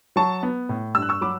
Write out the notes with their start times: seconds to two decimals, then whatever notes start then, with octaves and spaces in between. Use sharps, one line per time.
0.16 F#3 A5 C#6
0.43 B3
0.69 A2
0.95 G2 E6
1.02 F#6
1.09 C#6 E6
1.21 F#3 B5 D6